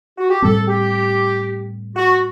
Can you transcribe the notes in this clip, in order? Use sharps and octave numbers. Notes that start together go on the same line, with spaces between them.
F#4
G4
A2 G3 C4 A4
G4
F#4